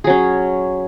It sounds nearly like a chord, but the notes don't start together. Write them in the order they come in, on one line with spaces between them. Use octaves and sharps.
G#4 F#3 C#4